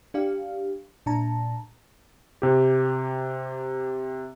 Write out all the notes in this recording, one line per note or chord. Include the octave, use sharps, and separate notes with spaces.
D4 G4 F5
A#2 D4 A5 A#5
C3 G4